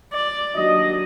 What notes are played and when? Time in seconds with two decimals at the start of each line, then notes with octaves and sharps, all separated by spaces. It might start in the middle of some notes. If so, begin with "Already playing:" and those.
0.13 D5
0.56 D#2 F#3 D4 D#5